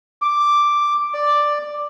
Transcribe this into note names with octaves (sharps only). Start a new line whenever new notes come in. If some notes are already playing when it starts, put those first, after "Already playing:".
D6
D5